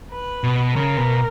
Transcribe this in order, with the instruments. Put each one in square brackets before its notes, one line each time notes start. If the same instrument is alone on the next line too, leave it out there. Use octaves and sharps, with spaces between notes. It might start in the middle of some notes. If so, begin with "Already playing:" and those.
[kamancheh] B4
[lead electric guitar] B2
[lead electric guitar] C#3 [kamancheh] A#4
[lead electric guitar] B2